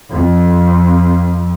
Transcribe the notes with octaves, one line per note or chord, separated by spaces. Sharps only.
F2